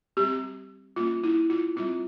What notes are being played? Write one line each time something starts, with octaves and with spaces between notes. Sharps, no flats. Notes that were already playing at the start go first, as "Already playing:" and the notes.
G3 C4 G4
G3 A#3 C#4 F4
E4
F4
G3 C4 F4